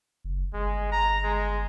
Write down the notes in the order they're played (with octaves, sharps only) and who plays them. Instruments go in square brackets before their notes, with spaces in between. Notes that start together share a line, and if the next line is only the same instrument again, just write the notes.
[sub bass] F#1
[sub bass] G1 [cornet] G#3
[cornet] A#5
G#3